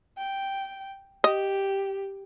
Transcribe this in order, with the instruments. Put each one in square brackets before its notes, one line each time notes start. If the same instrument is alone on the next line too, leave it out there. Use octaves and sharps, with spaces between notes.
[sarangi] G5
[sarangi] G4 [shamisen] D#5